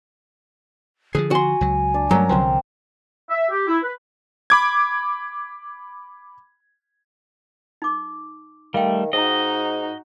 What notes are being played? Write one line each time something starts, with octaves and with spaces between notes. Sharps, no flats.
D3 E3 F3 G#4
F#4 G#5 C6
C#2 F#3
D4
G2 F#3 G#3 A3 C#4 A#4 A#5
C2 D3 F3 C4 C5
E5
G4
E4
B4
B5 D6 G#6
D#4 D6
D#3 G3 A3 F5 G5
G#2 D#4 F#4 D#5